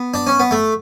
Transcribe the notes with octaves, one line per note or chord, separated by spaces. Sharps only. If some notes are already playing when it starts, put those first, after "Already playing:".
Already playing: B3
D4
C#4
B3
A3